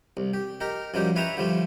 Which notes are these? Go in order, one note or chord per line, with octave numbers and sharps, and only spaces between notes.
C2
G4
D#4 G4 A#4
F#2 F3 G3 D#4 G4
E4 B4 C#5 E5 G5 A#5
D3 F3 G3 A3